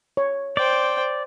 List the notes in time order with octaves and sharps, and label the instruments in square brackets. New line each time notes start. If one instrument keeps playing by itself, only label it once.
[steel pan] C#5
[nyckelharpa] C5 G5 [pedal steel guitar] D5